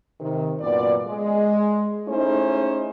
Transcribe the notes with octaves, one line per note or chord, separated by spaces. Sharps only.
C3 D#3
F#2 A#2 B3 D5
G#3
A3 C#4 D#4 E4 G#4 C5